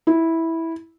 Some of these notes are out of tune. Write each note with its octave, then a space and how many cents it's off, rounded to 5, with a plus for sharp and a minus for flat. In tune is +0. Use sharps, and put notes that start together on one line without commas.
E4 -10